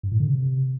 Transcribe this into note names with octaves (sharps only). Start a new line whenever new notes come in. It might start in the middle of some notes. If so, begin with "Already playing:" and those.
G2
A2
D3
C3